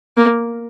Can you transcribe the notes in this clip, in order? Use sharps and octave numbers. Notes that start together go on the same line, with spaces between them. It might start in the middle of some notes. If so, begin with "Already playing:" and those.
A#3